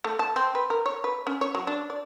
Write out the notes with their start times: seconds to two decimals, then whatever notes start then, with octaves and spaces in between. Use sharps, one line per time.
0.04 A3
0.19 A5
0.36 C4
0.55 B4
0.70 A#4
0.86 C#5
1.04 B4
1.27 C#4
1.41 C#5
1.55 F#3
1.67 D4
1.90 D5